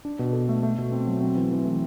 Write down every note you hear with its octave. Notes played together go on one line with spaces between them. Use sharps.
D4
B2
A4
A3
A3
B2
C4
F#3
C4
E3
E3
A3